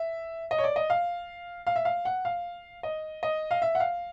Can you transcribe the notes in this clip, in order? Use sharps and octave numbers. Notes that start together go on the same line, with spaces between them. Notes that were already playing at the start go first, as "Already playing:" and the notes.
Already playing: E5
D#5
C#5
D5
D#5
F5
F5
E5
F5
F#5
F5
D#5
D#5
F5
E5
F#5
F5